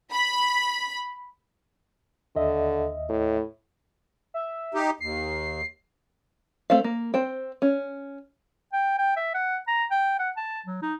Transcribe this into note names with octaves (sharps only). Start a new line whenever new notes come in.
B5
D#2 D3 D#5 E5
A2
E5
D#4 G4
D#2 C7
A3 C4 C5 F5
A#3
C4 C5 G5
C#4
G5
G5
E5
F#5
A#5
G5
F#5
A5
F#3
D#4